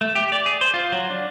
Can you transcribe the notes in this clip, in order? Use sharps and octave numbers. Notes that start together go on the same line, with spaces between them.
A3
G4
D5
G#4
C5
F4
F#3
D4